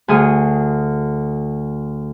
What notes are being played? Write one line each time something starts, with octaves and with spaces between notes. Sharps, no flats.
D2 G#4 D#6